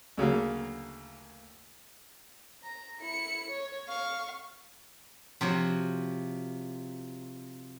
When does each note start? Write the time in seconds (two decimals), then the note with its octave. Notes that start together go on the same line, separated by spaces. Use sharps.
0.17 D2 C#3 F#3 A#3
2.63 A#5
3.00 E4 C#7
3.50 C#5
3.88 F5 C#6
5.41 C3 F3 F#4 C#5